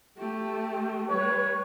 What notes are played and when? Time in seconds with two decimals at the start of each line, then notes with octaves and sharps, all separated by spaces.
0.18 A3 G4
1.09 G3 B4 C#5